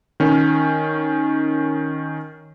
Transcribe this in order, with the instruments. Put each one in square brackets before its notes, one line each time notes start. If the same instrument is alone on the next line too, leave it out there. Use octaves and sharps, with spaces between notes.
[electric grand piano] D#3 C#4